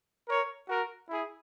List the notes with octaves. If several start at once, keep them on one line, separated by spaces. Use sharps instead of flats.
A#4 C#5
F#4 A#4
E4 G#4